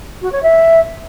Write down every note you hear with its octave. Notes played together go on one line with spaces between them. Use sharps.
F#4
C#5
E5